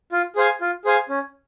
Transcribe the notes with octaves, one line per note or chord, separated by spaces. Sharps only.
F4
G#4 C5 F5 G#5
F4
G#4 C5 F5 G#5
C#4